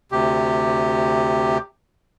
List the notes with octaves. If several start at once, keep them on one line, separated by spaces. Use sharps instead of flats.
D2 C3 G4